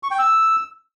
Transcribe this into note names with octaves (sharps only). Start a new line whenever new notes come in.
C#6
G5
E6